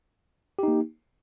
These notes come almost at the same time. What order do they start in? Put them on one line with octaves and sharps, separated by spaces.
G4 D#4 A#3